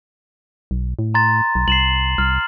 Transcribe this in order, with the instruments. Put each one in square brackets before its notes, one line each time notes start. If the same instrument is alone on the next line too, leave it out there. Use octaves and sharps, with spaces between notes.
[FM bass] B1
A2
[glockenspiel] A#5 C6 A6
[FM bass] B1
[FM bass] C2 [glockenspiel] C7 E7 F#7
[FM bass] C2 [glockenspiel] F6